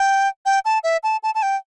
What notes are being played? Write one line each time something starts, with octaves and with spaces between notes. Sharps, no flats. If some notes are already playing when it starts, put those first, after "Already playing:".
Already playing: G5
G5
A5
E5
A5
A5
A5
G5